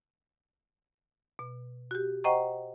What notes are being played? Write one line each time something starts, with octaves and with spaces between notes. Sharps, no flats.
B2
F#4 G4
C5 D#5 F#5 G5 A#5 C#6